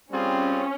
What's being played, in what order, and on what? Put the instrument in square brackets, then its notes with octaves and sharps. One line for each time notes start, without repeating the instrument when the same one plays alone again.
[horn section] G3 C4 F4 G#4 [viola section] C#4